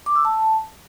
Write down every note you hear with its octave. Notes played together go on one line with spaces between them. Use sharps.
D6
E6
A5